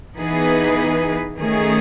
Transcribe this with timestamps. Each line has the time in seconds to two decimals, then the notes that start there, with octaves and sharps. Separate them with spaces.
0.16 E3 B3 D#4 G#4 B4
1.38 D#3 A3 C#4 G#4